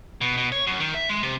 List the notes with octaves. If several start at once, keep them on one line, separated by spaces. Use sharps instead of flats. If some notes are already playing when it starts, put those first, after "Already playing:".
B2
B2
C#5
F#2
D#3
E5
G#3
C3